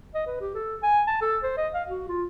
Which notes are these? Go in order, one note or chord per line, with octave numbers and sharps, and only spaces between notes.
D#5
B4
G4
A4
G#5
A5
A4
C5
D#5
F5
F#4
F4